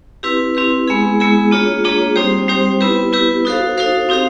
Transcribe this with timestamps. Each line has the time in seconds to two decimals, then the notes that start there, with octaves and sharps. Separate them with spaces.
0.23 C4 E4 G4 B4
0.55 C4 E4 G4 B4
0.88 G#3 B3 E4 G#4
1.20 G#3 B3 E4 G#4
1.51 A#3 D4 F4 G#4 C#5
1.84 A#3 D4 F4 G#4 C#5
2.16 G3 C4 D#4 G4 C5
2.48 G3 C4 D#4 G4 C5
2.81 B3 E4 G4 B4
3.13 B3 E4 G4 B4
3.45 D#4 F#4 A4 C5 F5
3.77 D#4 F#4 A4 C5 F5
4.09 C4 D#4 G4 C5 F5